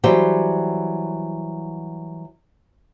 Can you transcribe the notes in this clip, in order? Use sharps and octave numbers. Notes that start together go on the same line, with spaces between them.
E3 F#3 G3 G4 C5 G5